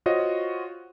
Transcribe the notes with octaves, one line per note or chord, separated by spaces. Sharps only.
F4 F#4 C5 C#5 D#5